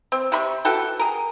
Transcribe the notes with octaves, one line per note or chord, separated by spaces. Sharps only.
C4
C3 B5 C#6
E3 F#4 A4 G5
G#4 A#4